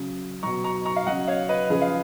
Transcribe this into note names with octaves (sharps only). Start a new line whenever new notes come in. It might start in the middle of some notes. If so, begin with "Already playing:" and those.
Already playing: C#3 F#3
B2 F#3 A#5 C#6
A#5 C#6
A#5 C#6
F5
C#3 F#3 D#5 F#5
C#5 F5
B4 D#5
C#3 F3 G#4 B4
F5